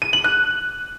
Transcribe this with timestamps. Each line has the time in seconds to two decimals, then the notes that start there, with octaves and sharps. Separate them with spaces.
0.02 D#7
0.13 F#7
0.24 F#6